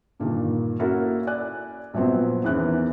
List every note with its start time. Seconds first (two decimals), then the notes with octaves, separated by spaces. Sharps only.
0.20 G2 A#2 D3 D#3
0.79 A#3 C#4 E4 F#4 A4 A#4
1.27 D5 G#5 F#6
1.94 A#1 F3 F#3 B3 C4
2.44 E2 D#3 E3 B3 C#4 F#6